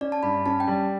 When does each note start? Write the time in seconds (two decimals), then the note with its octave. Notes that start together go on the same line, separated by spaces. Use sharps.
0.01 C#4 D5
0.12 A5
0.23 G2 B5
0.46 C#4 A5
0.60 G5
0.68 G3